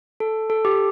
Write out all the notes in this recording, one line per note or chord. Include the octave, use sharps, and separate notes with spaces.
A4
A4
G4